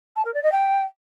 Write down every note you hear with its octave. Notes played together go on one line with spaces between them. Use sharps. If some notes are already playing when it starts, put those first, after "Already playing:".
A5
A#4
D5
D#5
G5